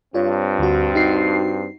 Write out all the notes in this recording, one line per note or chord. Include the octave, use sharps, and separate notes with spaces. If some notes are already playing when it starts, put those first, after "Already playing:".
G2 C4 F4 C#5
D2 F#4
D#4 F#4 C7